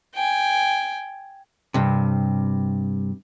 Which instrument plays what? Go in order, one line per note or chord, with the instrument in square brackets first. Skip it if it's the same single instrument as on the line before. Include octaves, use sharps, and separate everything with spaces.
[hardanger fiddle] G5 G#5
[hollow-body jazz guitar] G2 C3